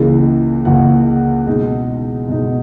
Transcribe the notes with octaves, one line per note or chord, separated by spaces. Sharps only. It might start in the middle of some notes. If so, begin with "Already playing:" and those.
Already playing: C#2 C#3 E3 A#3
C#2 C#3 E3 A#3 F#5
B2 G#3 D#4
B2 G#3 D#4